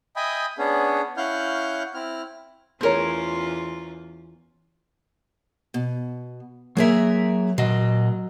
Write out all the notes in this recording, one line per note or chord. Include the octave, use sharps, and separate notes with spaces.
D#5 E5 G5 G#5 B5 D#6
B3 C#4 D4 G#4
C#4 E4 F5 F#5 F6 G6
C4 E4 F6
E2 A3 C#4 F4 G#4 A#4 C5 C#5
B2
F#3 A#3 G#4 A#4 E5
A#2 F#3 D#5